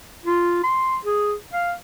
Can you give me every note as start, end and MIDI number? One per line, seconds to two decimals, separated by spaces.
0.26 0.62 65
0.64 0.97 84
1.05 1.34 68
1.53 1.73 77